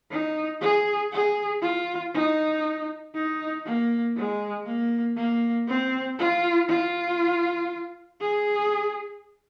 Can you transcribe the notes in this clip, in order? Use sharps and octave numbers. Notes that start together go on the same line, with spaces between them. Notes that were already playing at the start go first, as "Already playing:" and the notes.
D#4
G#4
G#4
F4
D#4
D#4
A#3
G#3
A#3
A#3
C4
F4
F4
G#4